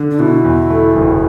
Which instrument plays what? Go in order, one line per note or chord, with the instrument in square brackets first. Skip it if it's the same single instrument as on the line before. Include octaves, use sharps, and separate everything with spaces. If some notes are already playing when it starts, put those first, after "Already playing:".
Already playing: [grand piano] D3
[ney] D4
[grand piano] B2 [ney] E4
[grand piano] E2
A3
F#1